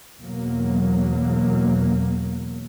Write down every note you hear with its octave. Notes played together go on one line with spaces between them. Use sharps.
E2 B2 F#3 A#3